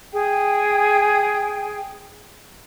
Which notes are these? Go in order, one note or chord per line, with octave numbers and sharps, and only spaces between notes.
G#4 G5